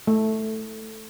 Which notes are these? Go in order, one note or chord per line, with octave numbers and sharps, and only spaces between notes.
A3